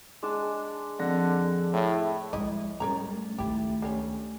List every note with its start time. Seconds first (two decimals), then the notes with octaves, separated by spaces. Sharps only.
0.23 G#3 D4 A5
1.00 F2 D3 F#5 A#6
1.73 A2
2.33 F3 G#3 E4 D#5
2.80 G3 C#4 D4 A#4 C#5 A#5
3.09 A3
3.38 C#2 D#3 E4 G4
3.82 D3 G3 C#4